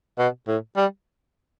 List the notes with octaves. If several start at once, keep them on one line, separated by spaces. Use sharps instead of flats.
B2
A2
G3